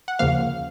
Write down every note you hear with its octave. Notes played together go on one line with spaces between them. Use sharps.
F#5
D#2 C#3 F3 A#3 F5